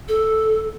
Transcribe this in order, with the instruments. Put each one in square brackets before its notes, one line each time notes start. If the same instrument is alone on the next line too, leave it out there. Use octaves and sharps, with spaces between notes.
[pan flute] A4